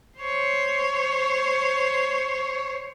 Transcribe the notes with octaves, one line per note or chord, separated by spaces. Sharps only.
C5 C#5